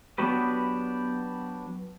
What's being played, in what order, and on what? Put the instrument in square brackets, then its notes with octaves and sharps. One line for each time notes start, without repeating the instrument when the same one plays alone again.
[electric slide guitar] F#3 B3 D4 F#4 G4 B4